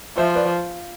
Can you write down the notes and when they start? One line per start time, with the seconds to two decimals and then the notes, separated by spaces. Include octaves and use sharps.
0.17 F3 C5 E5
0.35 B4 D5